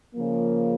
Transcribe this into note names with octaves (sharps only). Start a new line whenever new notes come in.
C#3 F3 A#3